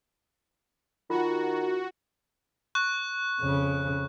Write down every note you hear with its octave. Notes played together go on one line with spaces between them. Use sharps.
D#3 F4 F#4
C#6 F#6
F2 C#3